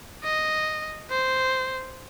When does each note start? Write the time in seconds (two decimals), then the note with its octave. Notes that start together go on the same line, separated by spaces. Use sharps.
0.24 D#5
1.11 C5